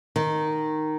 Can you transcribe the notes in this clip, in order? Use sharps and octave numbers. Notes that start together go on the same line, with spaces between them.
D#3